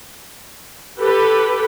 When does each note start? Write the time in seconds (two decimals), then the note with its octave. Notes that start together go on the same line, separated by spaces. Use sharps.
1.01 G4 A4 B4